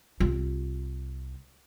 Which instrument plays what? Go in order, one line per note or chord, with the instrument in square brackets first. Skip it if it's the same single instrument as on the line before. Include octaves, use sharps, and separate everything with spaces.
[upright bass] C2 F4